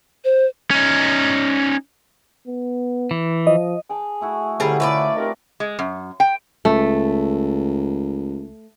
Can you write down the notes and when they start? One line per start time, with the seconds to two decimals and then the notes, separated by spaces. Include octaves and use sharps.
0.25 C5
0.71 C#4 D#4
2.48 B3
3.11 E3
3.47 F3 D#5
3.90 G#4 G5 A5
4.21 A3 E4 F#4
4.60 F2 A2 D3 G3 C#4 G#4 A#4 C#5
4.80 A3 E4 F4 B4 C#5 D5
5.16 C3 C4 D#4 A#4
5.60 G#3
5.79 F#2
6.20 G5
6.65 C#2 A3